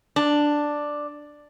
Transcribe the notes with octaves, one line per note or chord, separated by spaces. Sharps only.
D4